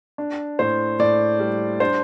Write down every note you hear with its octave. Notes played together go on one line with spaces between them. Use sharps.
D4
A2 C5
A2 D5
G3
D4 C5